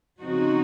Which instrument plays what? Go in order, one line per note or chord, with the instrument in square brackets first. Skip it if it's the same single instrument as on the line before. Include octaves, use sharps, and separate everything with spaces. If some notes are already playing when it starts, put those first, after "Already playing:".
[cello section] C#3 F3 C4 D#4 F#4